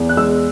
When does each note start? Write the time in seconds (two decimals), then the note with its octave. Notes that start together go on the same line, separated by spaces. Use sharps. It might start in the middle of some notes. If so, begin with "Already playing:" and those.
Already playing: E2
0.09 F#6
0.17 G#3 E6